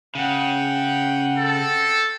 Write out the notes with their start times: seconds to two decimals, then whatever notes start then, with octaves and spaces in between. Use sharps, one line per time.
0.15 C#3 F#5 G5
1.38 C4 A4